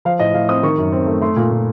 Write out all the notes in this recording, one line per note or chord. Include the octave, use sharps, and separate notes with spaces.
F3 F5
A2 D#5
A2 F5
C4 D#6
D#3 C#6
F#2
C4
A3
A3 C6
A#2
A#2